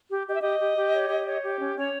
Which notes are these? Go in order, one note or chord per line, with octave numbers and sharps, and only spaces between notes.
G4
G4 D#5
E5
G4 D#5
G4
G4
C#5
G4
C#5
G4
C#4
C#4 C#5